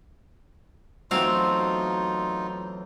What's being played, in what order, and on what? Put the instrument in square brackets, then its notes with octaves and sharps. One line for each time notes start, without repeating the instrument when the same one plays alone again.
[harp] E2 F#3 [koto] A3 C4 F5 [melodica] D#4 F4